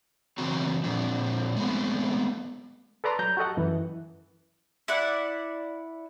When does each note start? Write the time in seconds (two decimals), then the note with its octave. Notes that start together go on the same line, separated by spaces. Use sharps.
0.38 C#3 E3 F#3 C4 F#4 A#5
0.84 A#2 D3 F3 C4 D4
1.57 G#3 A3 B3 C4
3.04 A4 B4 D5 A#5 C6 D6
3.19 F#3 A#5 G6
3.37 F#4 G4 A4 D#5 F#5
3.57 F#2 E3
4.88 E4 D5 F#5